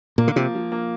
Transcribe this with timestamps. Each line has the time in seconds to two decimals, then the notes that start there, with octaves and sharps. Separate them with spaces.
0.18 A#2 A#3
0.28 D3
0.36 C3 F3
0.55 F3
0.72 A#3